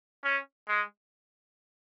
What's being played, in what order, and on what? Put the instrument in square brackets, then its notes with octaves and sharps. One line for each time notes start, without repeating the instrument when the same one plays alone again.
[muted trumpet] C#4
G#3